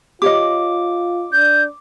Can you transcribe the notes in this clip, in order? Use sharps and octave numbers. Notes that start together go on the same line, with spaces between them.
F4 G4 C#5 D#5 D6
D4 G6